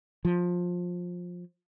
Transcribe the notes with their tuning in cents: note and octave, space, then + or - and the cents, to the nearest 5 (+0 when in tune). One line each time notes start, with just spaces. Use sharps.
F3 +20